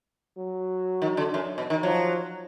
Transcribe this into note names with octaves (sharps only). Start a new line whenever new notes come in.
F#3
D#3
D3
F#2
B2
D#3
F3 F#3